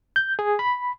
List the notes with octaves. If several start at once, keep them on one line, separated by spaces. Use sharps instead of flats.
G6
G#4
B5